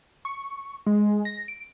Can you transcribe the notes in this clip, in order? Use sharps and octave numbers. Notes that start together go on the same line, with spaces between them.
C#6
G#3
A#6
D7